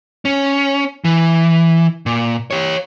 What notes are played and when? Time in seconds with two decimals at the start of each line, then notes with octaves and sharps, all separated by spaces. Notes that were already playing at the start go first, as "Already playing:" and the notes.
0.25 C#4
1.05 E3
2.06 A#2
2.51 G4 C#5